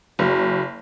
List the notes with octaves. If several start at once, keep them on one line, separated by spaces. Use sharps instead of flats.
F#1 F#4